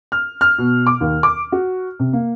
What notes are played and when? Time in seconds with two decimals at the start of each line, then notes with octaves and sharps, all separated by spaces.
0.12 F6
0.41 F6
0.58 B2
0.87 D6
1.01 D#2
1.23 D6
1.52 F#4
2.00 C3
2.13 A#3